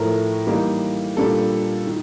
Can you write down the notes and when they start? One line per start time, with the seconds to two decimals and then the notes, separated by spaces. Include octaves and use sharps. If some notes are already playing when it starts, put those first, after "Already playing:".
Already playing: A2 F3 A3 A#4
0.47 E3 G3 A#3 D#4
1.17 A#2 G3 A#3 D4 A4
1.87 D#3